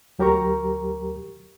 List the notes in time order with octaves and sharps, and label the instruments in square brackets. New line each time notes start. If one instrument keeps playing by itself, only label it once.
[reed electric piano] D2 F#3 G4 A#4 A#5 C#6